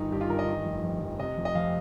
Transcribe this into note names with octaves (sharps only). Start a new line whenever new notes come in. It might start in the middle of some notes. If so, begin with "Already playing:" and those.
Already playing: G1 D#3 D#4
G2 G4
F4
G1 A#4
D#5
D#3
F1
F2
F1
C3 D#5
F1
D#5
F2 F5